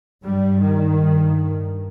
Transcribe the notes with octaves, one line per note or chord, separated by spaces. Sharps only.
G2 G3
D#3
G2